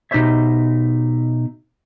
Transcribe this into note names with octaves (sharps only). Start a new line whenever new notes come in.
B2 D#4 G4 C5 C#5 E5